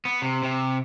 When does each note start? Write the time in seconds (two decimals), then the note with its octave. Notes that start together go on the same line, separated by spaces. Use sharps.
0.05 B3
0.22 C3
0.43 C3